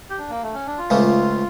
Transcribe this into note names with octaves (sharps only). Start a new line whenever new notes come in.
G4
D4
A#3
A3
C#4
D4
F4
C#2 C#3 F3 A3